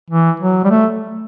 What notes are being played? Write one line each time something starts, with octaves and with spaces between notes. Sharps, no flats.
E3
F#3
G3
A3